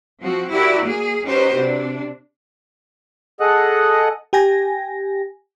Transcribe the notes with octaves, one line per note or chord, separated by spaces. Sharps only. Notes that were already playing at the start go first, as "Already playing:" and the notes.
F3 C4 F#4
E4 F#4 G4 A#4 D5
A#3 G#4
C#4 D#4 F#4 G4 B4 C5
C3 D4
G#4 A4 D#5 F#5 D#6 F#6
G4 G5 G#5 A#6